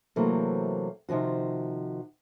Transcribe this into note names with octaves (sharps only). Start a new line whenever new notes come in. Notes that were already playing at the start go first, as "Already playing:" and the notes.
C3 E3 F#3 A3 A#3 C4
C3 D#3 F3 F#4